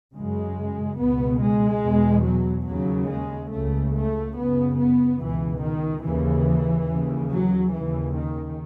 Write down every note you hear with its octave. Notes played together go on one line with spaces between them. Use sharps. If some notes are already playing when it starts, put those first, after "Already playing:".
F#2 C#3 G#3
C#2 B2 B3
G#3
E2 B2
F#3
D#2 C#3 F#3
G#3
C#2 C#3 A3
A3
F#2 C#3 B3
B3
C#2 B2 E3
D#3
D#2 C#3 E3
D#2 C#3
F#3
D#2 C#3 E3
D#3